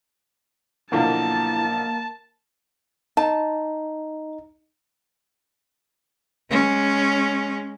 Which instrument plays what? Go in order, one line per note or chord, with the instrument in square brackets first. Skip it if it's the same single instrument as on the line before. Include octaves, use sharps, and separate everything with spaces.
[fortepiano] B1 D3 F3 [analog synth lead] A#3 [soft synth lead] E4 [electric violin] A5
[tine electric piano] D#4 [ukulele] A5
[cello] G#3 C#4